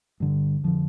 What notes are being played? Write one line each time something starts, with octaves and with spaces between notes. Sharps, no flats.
G2 D3
F2 D3 F3